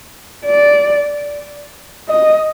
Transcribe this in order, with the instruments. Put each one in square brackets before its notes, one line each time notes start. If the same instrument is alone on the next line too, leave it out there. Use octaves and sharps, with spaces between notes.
[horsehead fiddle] D5
D#5